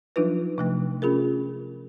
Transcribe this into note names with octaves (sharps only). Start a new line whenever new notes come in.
F3 F#3 D4 D#4 F4 B4
C3 F3 A3
C#4 F4 G#4 A#4